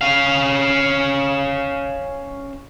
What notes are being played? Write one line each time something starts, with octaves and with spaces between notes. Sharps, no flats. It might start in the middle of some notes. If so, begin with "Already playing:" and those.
C#4 F5